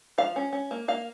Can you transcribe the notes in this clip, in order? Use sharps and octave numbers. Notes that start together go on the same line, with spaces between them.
F3 F5
C#4
C#4
A#3
A#3 F5